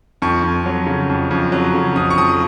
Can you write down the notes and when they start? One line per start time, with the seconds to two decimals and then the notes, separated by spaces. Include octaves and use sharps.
0.22 F2 C#6
0.44 F2
0.66 F#3
0.87 C#3
1.09 F2
1.31 F2
1.52 F#3
1.74 C#3
1.96 F2 D#6
2.10 C#6
2.17 F2 D#6